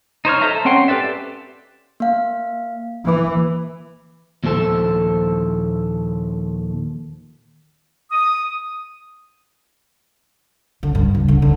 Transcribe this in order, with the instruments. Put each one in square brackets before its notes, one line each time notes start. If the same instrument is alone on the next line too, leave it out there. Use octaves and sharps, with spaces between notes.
[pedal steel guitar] D#4 C5 C#5 F6
A4 C5 D#5 E5 A#5
C4 C#4 F#5 G5 C6
G4 A4 B4 D5 E5
[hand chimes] A#3 F5
[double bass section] E3 [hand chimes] A#3 D6
[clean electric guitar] D#2 A#2 F3 A4 C5
[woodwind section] D#6
[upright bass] D3
G2
C#2
D3
D3